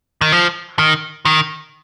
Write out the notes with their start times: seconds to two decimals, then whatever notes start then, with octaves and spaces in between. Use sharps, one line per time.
0.21 D#3
0.32 F3
0.79 D#3
1.25 D#3